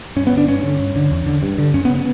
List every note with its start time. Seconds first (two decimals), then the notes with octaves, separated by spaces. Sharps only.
0.16 G2 C#4
0.27 B3
0.32 D3
0.37 D4
0.48 G2 C#4
0.63 D3
0.79 G2
0.96 D3
1.11 E2
1.26 D3
1.43 G2
1.58 D3
1.74 F#2 C#4
1.85 B3
1.90 C#3
1.95 B3